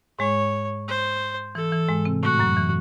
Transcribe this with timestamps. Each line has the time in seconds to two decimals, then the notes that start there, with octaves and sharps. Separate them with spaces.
0.19 G#2 G#3 C#5
0.88 C5
1.55 E3 A4
1.72 E3
1.88 G#2 G#3
2.05 C3 C4
2.23 A2 A3 F#4
2.39 F#2 F#3
2.57 E3